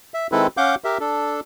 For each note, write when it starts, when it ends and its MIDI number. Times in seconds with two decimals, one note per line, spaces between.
0.14 0.27 76
0.32 0.47 51
0.32 0.47 56
0.32 0.47 60
0.32 0.47 64
0.32 0.47 69
0.32 0.47 71
0.57 0.75 61
0.57 0.75 77
0.57 0.75 78
0.57 0.75 86
0.57 0.75 91
0.84 0.98 67
0.84 0.98 70
0.84 0.98 76
1.00 1.40 62
1.00 1.40 69